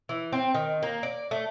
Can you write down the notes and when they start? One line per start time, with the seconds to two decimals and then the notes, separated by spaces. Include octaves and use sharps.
0.09 E3
0.32 C4
0.54 D#3
0.83 A#3
1.03 D5
1.31 A3